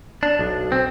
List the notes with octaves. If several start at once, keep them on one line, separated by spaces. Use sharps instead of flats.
D4
B1
C4